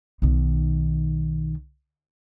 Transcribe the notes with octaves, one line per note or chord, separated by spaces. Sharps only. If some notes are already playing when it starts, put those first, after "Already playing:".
B1 D#3